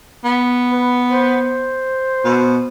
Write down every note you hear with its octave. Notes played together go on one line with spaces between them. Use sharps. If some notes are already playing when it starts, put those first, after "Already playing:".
B3
B4
C5
B2